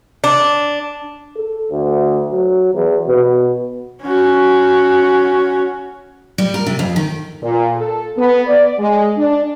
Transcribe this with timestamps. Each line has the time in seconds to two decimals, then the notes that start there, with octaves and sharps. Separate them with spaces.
0.24 D4
1.37 A4
1.72 D2
2.31 F#3
2.74 E2
3.08 B2
4.03 C#4 F#4
6.38 G3
6.54 A#4
6.66 C3
6.79 F2
6.96 D#3
7.43 A#2
7.76 A4
8.17 B3
8.47 D5
8.79 G#3
9.18 D4